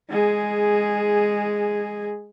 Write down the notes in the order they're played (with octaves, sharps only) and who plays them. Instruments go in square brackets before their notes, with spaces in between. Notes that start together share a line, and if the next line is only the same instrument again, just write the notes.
[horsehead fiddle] G#3 G#4